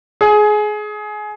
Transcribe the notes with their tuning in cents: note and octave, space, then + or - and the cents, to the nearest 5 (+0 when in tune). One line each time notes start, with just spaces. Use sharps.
G#4 +20